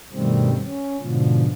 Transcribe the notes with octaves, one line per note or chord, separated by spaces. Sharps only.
G2 B2 D#3 G3 A3 C4
C#4
G#2 B2 D3 F3